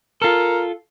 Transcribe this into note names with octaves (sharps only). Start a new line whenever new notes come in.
F4 A4 A#4